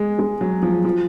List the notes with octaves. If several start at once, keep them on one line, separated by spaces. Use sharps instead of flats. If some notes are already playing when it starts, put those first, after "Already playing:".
Already playing: G#3
G#3
F#3
F3
F3